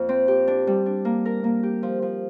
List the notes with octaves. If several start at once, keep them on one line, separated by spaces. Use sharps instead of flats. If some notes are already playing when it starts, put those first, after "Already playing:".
Already playing: F2 A#3 F4
C4
G4
D4
G3
D4
A#3
A#4
A#3
G4
F3
F3